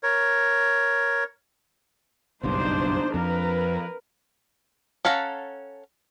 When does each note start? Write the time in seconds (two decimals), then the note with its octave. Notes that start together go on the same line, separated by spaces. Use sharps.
0.03 A#4 C#5
2.43 F#1 B1 G2 D4 D#4 C5
3.14 F2 F3 A#4 B4
5.05 C#4 A4 F5 F#5 A#5